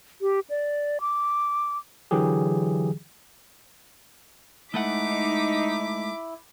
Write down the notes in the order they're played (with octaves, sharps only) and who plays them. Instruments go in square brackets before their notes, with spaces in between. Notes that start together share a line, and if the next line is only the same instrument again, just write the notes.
[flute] G4
D5
D6
[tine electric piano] D3 E3 F#3 G4 G#4
[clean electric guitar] G#3 A3 F#5 [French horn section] D#4 [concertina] E4 [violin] D6 B6